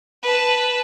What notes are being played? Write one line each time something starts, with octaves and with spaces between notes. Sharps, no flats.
B4 A5